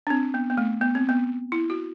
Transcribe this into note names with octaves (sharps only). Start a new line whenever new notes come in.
D4
C4
B3
B3
A3
B3
C4
B3
E4
F#4